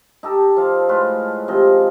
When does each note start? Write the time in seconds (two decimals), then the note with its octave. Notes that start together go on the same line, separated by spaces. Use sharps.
0.23 D#4 G4 A4
0.57 F3 F5
0.89 A2 G#3 F4 B4
1.48 C3 D#3 F3 D#5